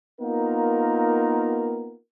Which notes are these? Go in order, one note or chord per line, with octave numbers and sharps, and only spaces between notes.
A#3 B3 D#4 F4 A#4